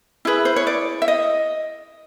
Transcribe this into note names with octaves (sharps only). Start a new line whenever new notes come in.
E4 G#4 B4 E5
C5
C#5
D5
E5
D#5